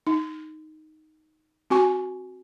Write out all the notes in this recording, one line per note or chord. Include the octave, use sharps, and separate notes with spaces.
D#4
C4 F#4 G#5 C#6